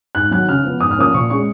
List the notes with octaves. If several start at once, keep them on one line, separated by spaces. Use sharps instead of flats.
G#2 F#6
D#3 F#3 F#6
C#3 F6
F3 B3
G#2 D#6
F6
F3 A#3 C#4 D#6
A#2 C#6
G#3 C#4 C#6